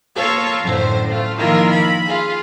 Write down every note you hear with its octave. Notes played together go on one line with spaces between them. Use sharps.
A#3 F4 A4 C#5 F5
F#2 A2 D3 C5
A3 F4
D#3 F3 A#3 E4 F4 A#4
B5
F4 G#4